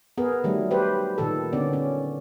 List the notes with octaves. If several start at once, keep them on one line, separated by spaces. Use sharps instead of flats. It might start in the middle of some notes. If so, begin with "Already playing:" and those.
B3 G#4 A#4 B4
D#3 F#3 G3 A3
G4 B4 C5
A#2 D#3 A4
D3 B3 C#4 D5
C#4